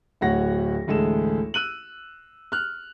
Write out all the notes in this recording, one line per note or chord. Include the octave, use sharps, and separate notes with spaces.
D1 D2 F#4 C#5 F#5 A#6
A1 D2 G#3 A4 E7
E6 F#6 D#7 F#7
F6 F#6